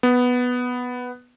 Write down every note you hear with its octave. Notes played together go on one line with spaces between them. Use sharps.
B3